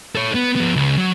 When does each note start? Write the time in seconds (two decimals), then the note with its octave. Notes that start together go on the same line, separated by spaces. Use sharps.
0.15 A4 C#5
0.35 B3
0.56 F3 B3
0.76 C#2
0.98 F#3